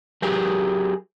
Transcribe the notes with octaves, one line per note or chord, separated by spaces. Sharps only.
F#3 G4 G#4 A#4